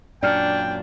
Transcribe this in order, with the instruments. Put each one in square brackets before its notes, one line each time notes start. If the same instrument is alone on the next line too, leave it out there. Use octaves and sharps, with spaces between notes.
[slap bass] F#2 A#2 [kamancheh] D4 [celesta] D5 F6 [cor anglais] G5